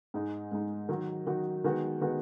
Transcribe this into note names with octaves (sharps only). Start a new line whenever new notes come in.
G#2 G#3 D#4
G#2 G#3 D#4
D#3 F#3 D#4 F#4
D#3 F#3 D#4 F#4
D#3 G#3 B3 F#4
D#3 G#3 B3 F#4